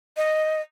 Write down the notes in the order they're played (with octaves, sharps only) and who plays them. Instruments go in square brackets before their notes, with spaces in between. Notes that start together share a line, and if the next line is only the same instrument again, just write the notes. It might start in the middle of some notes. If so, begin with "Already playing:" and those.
[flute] D#5